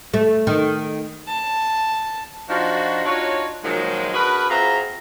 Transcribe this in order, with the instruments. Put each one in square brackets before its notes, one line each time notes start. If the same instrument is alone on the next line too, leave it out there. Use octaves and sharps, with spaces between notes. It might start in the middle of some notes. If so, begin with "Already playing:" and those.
[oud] A3
D#3
[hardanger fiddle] A5
[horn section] F3 D4 D#4 F4 F#4
D4 D#4 F4 F#4 C#5
A#2 D#3 F3 F#3 G#3
D4 F#4 G#4 A#4 B4
C4 F4 F#4 G#4 E5 A#5